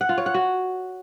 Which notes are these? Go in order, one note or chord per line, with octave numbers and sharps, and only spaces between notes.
F#5
F4
C#5
F#5
F#4